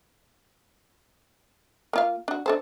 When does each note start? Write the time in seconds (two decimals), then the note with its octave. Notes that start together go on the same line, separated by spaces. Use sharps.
1.93 A#3 F4 F5
2.28 D4 F#4
2.46 D4 A4 C5